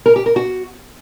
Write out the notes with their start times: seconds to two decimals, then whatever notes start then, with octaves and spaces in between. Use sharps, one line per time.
0.06 A#4
0.16 G4
0.26 A#4
0.36 F#4